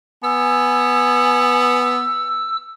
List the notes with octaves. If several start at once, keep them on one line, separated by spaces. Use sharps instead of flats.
B3 G#5 E6